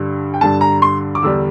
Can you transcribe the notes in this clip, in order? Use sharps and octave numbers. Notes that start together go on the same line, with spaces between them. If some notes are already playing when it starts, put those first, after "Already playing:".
Already playing: G2 D3 G3
G5
G2 D3 G3 A5
A#5
C6
D6
E2 D3 G3 D4 E6